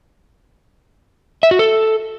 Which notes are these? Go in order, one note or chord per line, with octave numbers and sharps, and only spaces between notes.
E5
F#4
A4